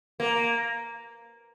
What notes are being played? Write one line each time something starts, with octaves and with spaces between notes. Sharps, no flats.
A#3